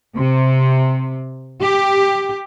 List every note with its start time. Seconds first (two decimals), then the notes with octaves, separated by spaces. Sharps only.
0.17 C3
1.61 G4